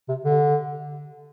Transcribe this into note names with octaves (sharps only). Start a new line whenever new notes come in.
C3
D3